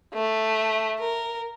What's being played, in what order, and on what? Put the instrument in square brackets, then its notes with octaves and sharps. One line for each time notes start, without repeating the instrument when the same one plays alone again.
[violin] A3
A#4